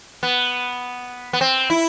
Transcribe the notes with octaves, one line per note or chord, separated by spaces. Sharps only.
B3
B3
C4
E4